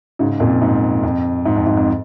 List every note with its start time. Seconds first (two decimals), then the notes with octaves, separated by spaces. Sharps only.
0.19 G#2 C#3
0.40 F2 A#2
0.62 G#2
1.03 F2
1.45 G#2
1.56 F2
1.67 G#2
1.77 F2